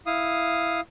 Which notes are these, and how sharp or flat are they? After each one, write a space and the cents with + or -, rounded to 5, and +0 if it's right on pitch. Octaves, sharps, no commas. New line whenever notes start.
E4 +0 F5 +0 D#6 +0